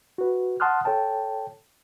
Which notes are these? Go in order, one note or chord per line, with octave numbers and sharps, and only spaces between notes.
F#4 B4
F#5 A5 C6 D#6 F6 F#6
A4 C#5 G5 A5